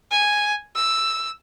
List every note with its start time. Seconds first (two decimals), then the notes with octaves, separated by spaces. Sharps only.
0.11 G#5
0.76 E6